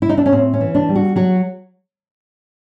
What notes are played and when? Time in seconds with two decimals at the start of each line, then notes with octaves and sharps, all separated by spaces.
0.02 E4
0.09 D#4
0.18 D4
0.26 C#4
0.32 A2 C4
0.54 C#4
0.61 E3
0.75 D4
0.89 G3
0.95 F#4
1.16 F#3 F#4